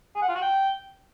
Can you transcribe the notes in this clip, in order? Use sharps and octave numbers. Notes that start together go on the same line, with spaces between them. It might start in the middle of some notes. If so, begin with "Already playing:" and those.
G#4
F#5
F4
F#4
G5